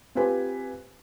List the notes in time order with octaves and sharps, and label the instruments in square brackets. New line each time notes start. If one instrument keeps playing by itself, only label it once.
[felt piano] C4 F4 G4 B4 G#5